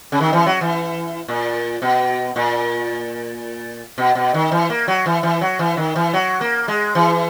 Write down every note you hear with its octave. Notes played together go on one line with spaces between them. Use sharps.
C#3
D#3
E3
F#3
E3
A#2
B2
A#2
B2
B2
D#3
E3
A#3
F#3
E3
E3
F#3
E3
D#3
E3
F#3
A#3
G#3
E3